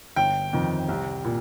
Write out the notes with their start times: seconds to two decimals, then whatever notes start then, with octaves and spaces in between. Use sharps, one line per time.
0.16 G1 G5
0.53 F2 D#3
0.88 C2
1.25 A#2